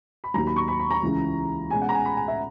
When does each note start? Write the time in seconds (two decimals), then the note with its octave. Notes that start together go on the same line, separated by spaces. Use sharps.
0.24 B5
0.34 D#2 D#3 F#3 A#5
0.47 B5
0.56 C#6
0.68 B5
0.79 B5
0.90 A#5
1.03 C#2 C#3 E3
1.70 B2 G#3 C#4 G#5
1.82 F#5
1.89 A#5
1.94 G#5
2.05 B5
2.16 G#5
2.28 E5